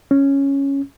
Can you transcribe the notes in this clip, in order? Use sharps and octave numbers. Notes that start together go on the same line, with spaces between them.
C#4